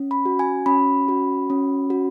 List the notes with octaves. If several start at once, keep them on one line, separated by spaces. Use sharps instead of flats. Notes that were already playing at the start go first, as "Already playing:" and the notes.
Already playing: C#4
B5
F#4
G#5
C#4 B5
F#4
C#4
F#4